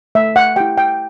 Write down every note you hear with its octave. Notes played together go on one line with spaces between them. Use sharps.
A3 E5
F#5
E4 G4 G5
G5